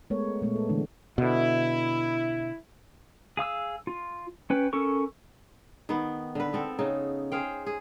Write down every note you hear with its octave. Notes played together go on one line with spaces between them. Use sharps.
G#3 A3 B3 A4 A#4 C#5
A#2 G#3 A3 B3
A4
D3 E3 G#3 A3 D4
B2 D3 E4
G#4 F5 D#6 E6
F4
C#4 B4 G5
C#4 A4 A#4 C#6
D#3 B3
D3 B4
B3 C4 A4
C#3 D#4
G#4 C5 F5 G5
G#4